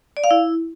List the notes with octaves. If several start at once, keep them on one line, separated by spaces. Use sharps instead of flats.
D5
F5
E4